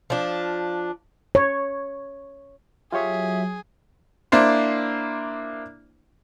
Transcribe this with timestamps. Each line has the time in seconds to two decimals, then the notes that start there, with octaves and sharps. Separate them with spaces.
0.10 F3 D4
1.35 C#5
2.92 F#3 F4 G4 G#4 C#5 E5
4.32 A#3 D4 E4 C5